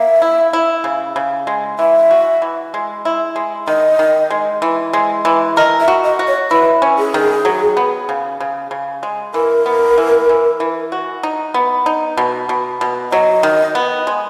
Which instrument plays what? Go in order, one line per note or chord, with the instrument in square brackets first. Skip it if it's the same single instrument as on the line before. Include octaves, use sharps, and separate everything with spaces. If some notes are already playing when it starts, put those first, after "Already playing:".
Already playing: [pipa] A#3 [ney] E5
[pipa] E4
E4
C#3
C#3
G#3
[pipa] E3 [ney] E5
[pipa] F#4
E3
G#3
E4
G#3
[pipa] D#3 [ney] D#5
[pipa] D#3
G#3
E3
G#3
E3
[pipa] A#4 [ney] D#5
[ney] E5
[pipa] F#4
[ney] D#5
[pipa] F#4
[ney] C#5
[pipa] E4 [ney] B4
[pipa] C#4
[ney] G#4
[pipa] D#3
F#3
B3
C#3
C#3
C#3
G#3
[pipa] E3 [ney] A#4
[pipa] B3
E3
E3
E3
F#4
D#4
B3
D#4
B2
B2
B2
[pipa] F#3 [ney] D#5
[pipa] D#3
B3
G#3